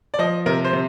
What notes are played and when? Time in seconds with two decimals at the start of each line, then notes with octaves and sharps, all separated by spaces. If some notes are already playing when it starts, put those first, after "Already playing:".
0.14 D5
0.19 F3 D#5
0.46 C3 A#4
0.65 C5
0.73 C3